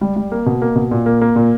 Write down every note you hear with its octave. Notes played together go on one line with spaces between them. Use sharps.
G3
G3
A#3
B2
A#3
B2
A#2
A#3
A#3
A#2